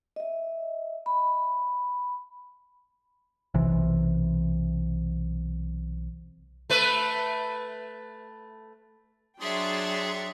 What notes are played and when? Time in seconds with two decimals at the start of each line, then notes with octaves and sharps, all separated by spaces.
0.16 D#5 E5
1.06 B5
3.54 B1 C3 E3
6.70 A3 B4
9.41 F#3 D4 G#4 C#5 E5 G5 C6 A6